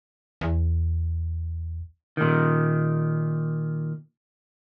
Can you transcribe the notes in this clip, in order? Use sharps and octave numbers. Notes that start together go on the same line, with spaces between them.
E2
A#2 D#3